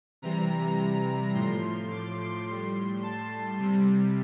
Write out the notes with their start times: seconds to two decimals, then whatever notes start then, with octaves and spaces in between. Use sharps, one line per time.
0.22 C3 E3 G3 A#5
1.34 A2 F3 C6
1.91 D6
2.46 A2 G3 C6
3.03 A5
3.58 C3 G3